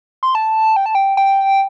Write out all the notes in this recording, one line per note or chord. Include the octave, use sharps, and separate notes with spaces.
C6
A5
G5
A5
G5
G5